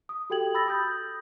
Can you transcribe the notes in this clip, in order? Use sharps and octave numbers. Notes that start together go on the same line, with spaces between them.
D#6
F#4 G4 A4 G5 G#6 F#7
B5 E6 A6 A#6
D#6 G6 A#6